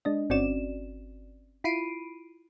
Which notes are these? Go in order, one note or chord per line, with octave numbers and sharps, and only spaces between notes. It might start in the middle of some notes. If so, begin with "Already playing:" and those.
G#3 D4 D#5
G1 C4 C#4 F#4 D5 E7
E4 F4 B5 C7 D7 D#7